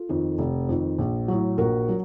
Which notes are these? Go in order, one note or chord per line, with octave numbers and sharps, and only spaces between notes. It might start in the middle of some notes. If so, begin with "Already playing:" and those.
Already playing: F4 A4
F2 D#3
F1
F2 D#3
A#1
A2 F#3
A#1 F#4 A#4
F#3